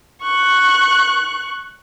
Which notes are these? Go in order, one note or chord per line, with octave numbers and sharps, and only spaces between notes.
C#6 F#6